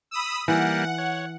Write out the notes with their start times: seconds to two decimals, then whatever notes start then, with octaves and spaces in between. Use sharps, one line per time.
0.11 B5 D#6 E6
0.48 E3 G3 A#3 F#5
0.98 C#5